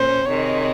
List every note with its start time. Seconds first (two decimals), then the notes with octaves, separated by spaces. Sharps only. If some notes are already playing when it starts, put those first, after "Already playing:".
Already playing: A#2 C#4 C5
0.25 C3 D#3 G#3 C#5